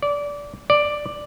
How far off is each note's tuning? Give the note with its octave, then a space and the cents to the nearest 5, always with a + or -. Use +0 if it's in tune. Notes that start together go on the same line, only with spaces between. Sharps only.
D5 -20
D5 +5